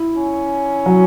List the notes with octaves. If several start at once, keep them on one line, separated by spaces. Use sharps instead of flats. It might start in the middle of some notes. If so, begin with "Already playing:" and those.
Already playing: E4
C#4
F#3